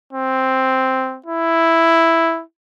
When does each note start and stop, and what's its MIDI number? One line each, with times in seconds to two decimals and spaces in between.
0.13 1.18 60
1.26 2.42 64